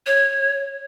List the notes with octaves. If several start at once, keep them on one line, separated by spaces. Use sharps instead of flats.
C#5